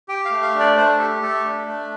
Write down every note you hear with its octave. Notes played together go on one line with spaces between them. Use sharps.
G4 G5
F5
A3
F5
D4
D5
D5
A3 C5
G4 A4
A3 A4
D4
A3